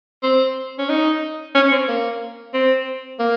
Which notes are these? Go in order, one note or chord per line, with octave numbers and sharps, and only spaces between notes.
C4
C#4
D#4
C#4
C4
A#3
C4
A#3